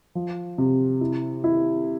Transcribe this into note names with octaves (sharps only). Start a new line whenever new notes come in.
F3
C3
E4
E4